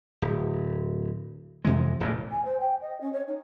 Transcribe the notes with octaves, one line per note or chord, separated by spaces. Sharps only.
D1
F2 C3 E3 G#3
D1 A1 E2 A#2
G#5
C5
G5
D#5
C#4
C#5
D#4